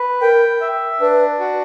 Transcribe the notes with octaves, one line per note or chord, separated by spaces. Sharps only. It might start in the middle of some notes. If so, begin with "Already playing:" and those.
Already playing: B4
A#4 G5
E5
D4 B4
F#4